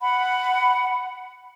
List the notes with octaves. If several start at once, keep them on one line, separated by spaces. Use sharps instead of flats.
F#5 B5